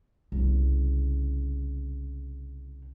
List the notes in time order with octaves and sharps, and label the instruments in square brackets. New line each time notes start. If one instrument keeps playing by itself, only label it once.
[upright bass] C2 C#3